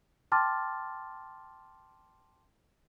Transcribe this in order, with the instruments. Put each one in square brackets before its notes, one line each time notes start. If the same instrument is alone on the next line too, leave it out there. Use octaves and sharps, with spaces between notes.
[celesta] G5 A5 C6 D6 F6 A6